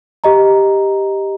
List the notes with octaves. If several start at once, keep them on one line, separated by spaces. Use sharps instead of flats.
G4 D#5 A#5